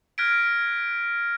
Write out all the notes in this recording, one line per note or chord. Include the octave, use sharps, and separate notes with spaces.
F6 F#6 G#6 A#6 B6 D7